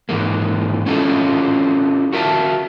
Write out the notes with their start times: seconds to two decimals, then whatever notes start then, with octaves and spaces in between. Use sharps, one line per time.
0.09 G#2 E3 G#3 A#3
0.86 C#4 E4 F4 A4 D#5
2.13 F#4 A#4 E5 F5 A5